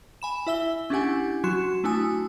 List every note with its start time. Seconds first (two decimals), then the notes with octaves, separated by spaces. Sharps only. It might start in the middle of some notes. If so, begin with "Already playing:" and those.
0.22 G#5 B5 E7
0.47 E4 E5 E6 G7
0.90 C#4 D4 E4 G4 F#5 G#5
1.44 F#3 F#4 C6 E7
1.84 A3 D4 E4 F#4 G#5 D#6